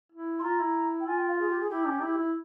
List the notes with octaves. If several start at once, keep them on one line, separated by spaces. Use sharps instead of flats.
E4
C6
F4 A#5
E4
G5
F4 G#5
G5
F5
G#4
G4
G#4
E4 G4
C#4
E4
E4